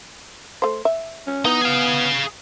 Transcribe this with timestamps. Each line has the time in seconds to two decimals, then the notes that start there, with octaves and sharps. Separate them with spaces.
0.62 A3 C5
0.85 E5
1.27 C#4
1.45 E3 B3 D#4
1.61 G#4 F5